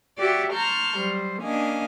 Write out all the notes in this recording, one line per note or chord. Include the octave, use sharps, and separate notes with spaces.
F#4 G4 C#5 D5 E5
A5 A#5 C6 C#6 F6 G6
F#3 G3 C5
A#3 C#4 D4 D#5 F5 G#5